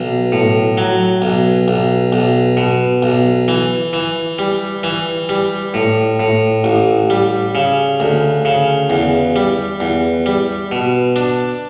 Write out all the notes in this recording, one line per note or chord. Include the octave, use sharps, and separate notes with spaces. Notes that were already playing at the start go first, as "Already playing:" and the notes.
Already playing: B1
A2
F#3
B1
B1
B1
B2
B1
E3
E3
G3
E3
G3
A2
A2
A1
G3
C#3
D2
C#3
E2
G3
E2
G3
B2
D4